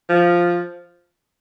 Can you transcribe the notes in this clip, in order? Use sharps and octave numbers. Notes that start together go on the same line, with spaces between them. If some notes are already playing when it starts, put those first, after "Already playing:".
F3